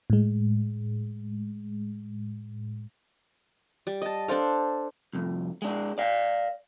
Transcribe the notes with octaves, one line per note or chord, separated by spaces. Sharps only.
A2 G#3
G3
D#5 A5
D4 A4 C5 F5
C2 F2
G#3 D4
D5 F5